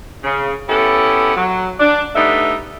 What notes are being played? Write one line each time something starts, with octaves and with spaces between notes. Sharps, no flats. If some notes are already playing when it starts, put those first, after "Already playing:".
C#3
B3 C#4 E4 G4 A4
F#3
D4
G3 A3 B3 D4 D#4 E5